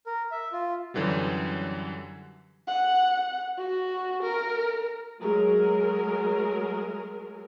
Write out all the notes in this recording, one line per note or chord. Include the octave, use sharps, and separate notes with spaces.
A#4
E5
F4
F#2 D3 E3 F#3 G3
F#5
F#4
A#4
F#3 G#3 A3 G#4 A#4